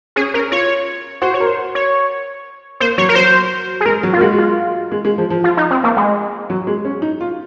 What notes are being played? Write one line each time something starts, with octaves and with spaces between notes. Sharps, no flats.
C#4 G#4
C#4 A#4
F4 C#5
F#4 C5
C#5
A#4
C5
C#5
A#3 C5
F#3 C#5
A#4
F#3 C5
G#4
G#3 A#4
F#3
F4
A#3
G#3 F#4
F4
G#3
G#3
F3
F3
F4
D#4
C4
A#3
G#3
F#3
G#3
C#4
D#4
F4